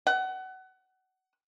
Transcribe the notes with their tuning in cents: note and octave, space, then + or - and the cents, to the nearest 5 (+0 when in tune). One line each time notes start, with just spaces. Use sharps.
F#5 +25